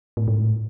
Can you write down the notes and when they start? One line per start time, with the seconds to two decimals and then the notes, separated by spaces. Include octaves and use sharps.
0.17 A2
0.28 G#2
0.38 A2